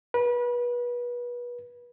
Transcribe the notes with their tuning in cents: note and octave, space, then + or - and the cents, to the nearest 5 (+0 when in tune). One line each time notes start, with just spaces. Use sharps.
B4 -30